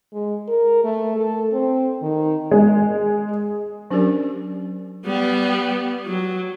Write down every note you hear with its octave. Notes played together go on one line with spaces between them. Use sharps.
G#3
A#4
A3
A4
C4
D#3
G#3
F#3 C#4 D4 G4 A#4 D5
G3 B3
F#3